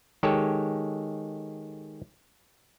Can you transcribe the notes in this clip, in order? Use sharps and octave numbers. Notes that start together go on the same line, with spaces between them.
D#3 G#3 G4 A4 C#5